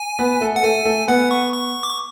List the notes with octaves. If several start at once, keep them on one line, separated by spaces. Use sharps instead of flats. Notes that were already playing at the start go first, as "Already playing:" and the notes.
Already playing: G#5
B3 B4
A3 A4
F#5
A3 A4 G#5
A3 A4
B3 B4 F#5
C#6
C#6
D6
C#6